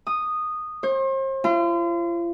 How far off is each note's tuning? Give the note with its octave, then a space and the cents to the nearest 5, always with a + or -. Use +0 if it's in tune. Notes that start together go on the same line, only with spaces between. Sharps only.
D#6 -10
C5 +40
F4 -40